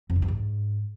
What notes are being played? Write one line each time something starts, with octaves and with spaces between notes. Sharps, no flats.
F2
D3
G2
G#2